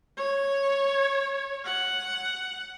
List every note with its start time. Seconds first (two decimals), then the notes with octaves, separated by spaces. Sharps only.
0.17 C#5
1.65 F#5